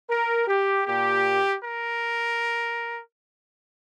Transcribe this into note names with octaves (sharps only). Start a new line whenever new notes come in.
A#4
G4
A#2 A#3 G4
A#4